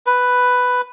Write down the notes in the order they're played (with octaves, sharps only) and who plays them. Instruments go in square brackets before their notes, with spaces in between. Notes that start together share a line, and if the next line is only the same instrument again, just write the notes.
[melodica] B4